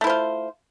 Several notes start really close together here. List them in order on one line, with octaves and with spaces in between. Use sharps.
A3 E4 C5 F4